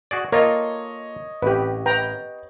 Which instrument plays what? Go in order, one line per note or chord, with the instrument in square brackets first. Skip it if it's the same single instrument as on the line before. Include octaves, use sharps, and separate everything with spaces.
[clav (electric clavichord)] F#4 G#4 D5
[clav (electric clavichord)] A#3 F4 A4 [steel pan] A#4 [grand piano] C#5 D#5
[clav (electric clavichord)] A1 [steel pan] G4 B4
[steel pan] B4 G5 A#5